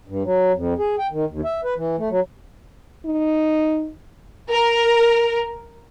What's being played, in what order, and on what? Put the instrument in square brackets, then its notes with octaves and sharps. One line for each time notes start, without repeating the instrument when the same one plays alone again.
[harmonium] G2
F#3
F2
G#4
G5
D#3
D#2
E5
B4
E3
A3
F#3
[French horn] D#4
[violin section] A#4